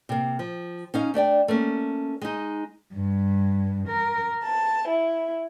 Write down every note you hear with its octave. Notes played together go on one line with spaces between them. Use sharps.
C3 A#3
F3
C#4 D#4 F5
A3 D4 D5 G5
A3 A#3 C#4
G#3 D#4
G2
A#4
A5
E4